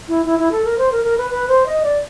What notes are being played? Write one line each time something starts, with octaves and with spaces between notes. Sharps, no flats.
E4
E4
E4
A4
A#4
C5
A#4
A#4
B4
B4
C5
D#5
D5